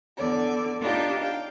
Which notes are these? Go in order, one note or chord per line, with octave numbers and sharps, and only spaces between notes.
E2 D3 D5
D4 D#4 F4 G4
F5 G5